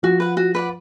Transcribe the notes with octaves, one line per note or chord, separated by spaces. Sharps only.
F3 F#4
B4 F#5
F#4
B4 D5 F#5